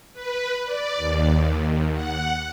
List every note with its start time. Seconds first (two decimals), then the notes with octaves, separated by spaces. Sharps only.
0.13 B4
0.65 D5
0.97 D#2
1.94 F#5